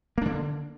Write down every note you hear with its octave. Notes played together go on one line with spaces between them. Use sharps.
D3 A#3 D4